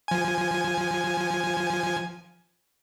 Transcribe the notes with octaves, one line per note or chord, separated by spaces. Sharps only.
F3 G#5